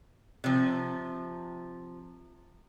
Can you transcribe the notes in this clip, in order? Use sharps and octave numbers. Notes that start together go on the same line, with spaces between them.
C3 F3